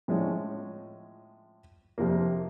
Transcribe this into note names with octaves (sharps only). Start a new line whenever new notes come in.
A2 F3 G#3 C#4
F2 C3 F3 A#3